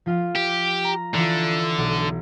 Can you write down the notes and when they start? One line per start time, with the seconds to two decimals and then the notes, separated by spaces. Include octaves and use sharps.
0.06 F3 F4 F5
0.35 G4
0.84 A#5
1.14 D3 E3 F4
1.58 E6
1.78 B1